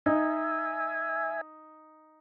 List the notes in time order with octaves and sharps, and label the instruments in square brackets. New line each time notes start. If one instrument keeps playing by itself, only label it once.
[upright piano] D#4 [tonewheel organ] E5 G#5